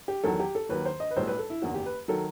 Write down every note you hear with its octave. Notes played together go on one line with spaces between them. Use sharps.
G4
E2 D#3 F#3 A4
G4
A4
D#2 D#3 F#3 B4
C5
D#5
B4
B1 A2 G3 C5
B4
A4
E4
F#1 E2 D#3 F#4
G4
B4
D#3 F#3 A4